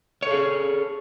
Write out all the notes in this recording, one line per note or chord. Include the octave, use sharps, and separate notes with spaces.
G#4 A4 C#5